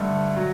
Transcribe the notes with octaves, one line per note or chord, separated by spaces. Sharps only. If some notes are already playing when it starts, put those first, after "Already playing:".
Already playing: G2 D3 A3
F#3